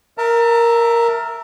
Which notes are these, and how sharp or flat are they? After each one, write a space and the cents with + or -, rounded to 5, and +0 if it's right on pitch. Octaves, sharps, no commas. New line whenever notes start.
A#4 +0 E5 +0 A5 +40